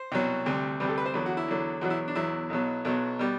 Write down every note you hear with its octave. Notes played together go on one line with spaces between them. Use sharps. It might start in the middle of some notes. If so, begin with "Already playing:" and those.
Already playing: C5
C2 B2 F#3
D2 C3 G3
D2 C3 G3 B4
A4
B4
C5
E2 D3 F#3 B4
F#4
E4
E2 D3 F#3
E2 B2 F#3 F#4
E4
D4
E2 B2 F#3 E4
B1 B2 F#3
B1 B2 F#3
B2 G3